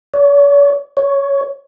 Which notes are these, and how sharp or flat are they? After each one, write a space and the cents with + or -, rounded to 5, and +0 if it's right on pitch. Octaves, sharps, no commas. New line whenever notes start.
C#5 +45
C#5 +10